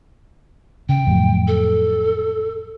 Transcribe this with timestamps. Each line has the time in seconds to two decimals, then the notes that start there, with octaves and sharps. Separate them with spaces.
0.89 C#3 G5
1.07 F2 A2 F#3
1.48 A4